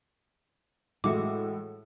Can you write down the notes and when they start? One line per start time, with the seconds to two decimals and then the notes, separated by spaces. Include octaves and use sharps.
1.04 A2 E3 G#3 A3 F#4 D6